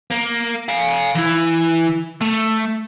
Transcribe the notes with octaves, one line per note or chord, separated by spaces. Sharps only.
A#3
F5 G#5
E3 E4
A3